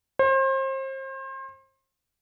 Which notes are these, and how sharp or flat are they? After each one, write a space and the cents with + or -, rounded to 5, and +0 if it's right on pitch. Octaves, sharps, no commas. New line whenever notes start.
C5 +35